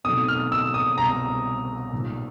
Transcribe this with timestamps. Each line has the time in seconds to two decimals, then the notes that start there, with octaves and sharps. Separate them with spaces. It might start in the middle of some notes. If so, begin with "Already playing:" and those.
0.04 B2 F#3 A3 C4 D#4 D#6
0.28 F6
0.52 E6
0.74 D#6
0.98 C2 B2 G3 C4 A#5
1.93 B1 A#2 G3